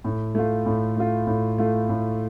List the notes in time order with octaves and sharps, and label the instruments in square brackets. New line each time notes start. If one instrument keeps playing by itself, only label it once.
[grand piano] A2
A3 F4
A2
A3 F4
A2
A3 F4
A2